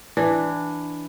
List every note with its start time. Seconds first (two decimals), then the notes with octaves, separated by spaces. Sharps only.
0.17 E3 D4